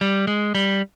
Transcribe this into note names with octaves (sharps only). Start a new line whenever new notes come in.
G3
G#3
G3